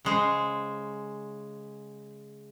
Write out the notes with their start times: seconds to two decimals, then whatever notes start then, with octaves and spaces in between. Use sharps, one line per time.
0.05 C#3 G#3 C5